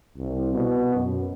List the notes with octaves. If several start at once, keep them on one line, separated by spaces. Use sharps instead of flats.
C2
B2
F#2